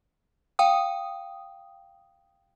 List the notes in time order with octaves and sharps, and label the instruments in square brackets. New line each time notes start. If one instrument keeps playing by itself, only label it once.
[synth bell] F5 G5 D#6